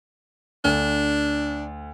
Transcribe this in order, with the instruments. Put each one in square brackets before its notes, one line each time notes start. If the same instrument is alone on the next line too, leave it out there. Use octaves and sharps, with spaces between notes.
[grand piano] D2 [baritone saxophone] D4